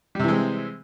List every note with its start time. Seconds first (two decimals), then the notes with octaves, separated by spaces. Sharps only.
0.15 G3
0.19 C3
0.24 E3
0.28 G#3
0.33 C4